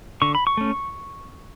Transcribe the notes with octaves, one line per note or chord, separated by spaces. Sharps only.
D3 C#6
B5
C#6
A3 C#4